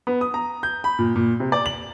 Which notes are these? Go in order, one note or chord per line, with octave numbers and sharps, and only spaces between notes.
B3
D#6
A#5
G6
B5
A#2
A#2
C3
D5
F#7